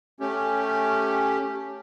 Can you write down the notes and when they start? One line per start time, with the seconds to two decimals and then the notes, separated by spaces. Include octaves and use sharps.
0.20 A3 C#4 G4